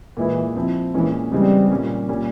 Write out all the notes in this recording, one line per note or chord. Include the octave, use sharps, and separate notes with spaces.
A#2 E3 G#3 E4
F3 C4 E4
A#2 E3 G#3 C#4
C#3 E3 G3 G#3 C4
A#2 G3 A#3 C#4
A#2 G3 C#4